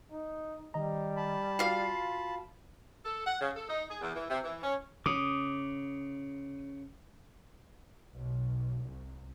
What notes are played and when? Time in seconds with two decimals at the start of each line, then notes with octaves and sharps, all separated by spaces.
0.12 D#4
0.74 D#3 G3 D#5 A#5
1.17 A5 B5
1.59 F4 F#4 F5
3.05 A4
3.26 F#5
3.41 C#3
3.56 A4
3.68 D#4
3.89 G#4
4.01 E2
4.15 E3
4.30 C3
4.43 E3
4.62 C#4
5.06 C#3 D6 D#6
8.13 B1
8.85 C2